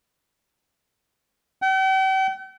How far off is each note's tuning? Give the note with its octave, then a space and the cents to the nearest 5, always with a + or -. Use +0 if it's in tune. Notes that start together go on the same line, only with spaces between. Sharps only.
G5 -45